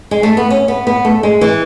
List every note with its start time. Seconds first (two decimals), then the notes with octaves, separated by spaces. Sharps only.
0.11 G#3
0.23 A3
0.37 B3
0.50 C#4
0.68 B3
0.87 B3
1.05 A3
1.23 G#3
1.41 E3